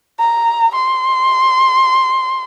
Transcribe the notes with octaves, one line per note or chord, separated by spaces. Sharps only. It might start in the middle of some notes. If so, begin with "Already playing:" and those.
A#5
C6